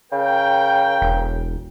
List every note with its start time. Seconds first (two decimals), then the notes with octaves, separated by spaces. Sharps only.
0.12 C#3 A#4 G5
1.02 E1